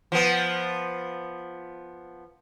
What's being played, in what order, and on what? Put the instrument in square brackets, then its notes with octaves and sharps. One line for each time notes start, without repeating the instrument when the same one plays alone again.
[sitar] F3 B3